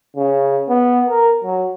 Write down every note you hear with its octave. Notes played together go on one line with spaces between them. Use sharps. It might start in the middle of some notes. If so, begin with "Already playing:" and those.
C#3
B3
A#4
F#3